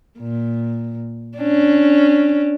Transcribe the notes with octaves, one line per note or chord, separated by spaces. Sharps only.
A#2
C#4 D4